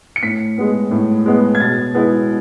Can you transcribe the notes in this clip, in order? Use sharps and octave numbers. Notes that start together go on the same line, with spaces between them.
C#7
A2 B6
G#3 B3
A2
G#3 B3
G#6
B2 A6
G#3 B3 E4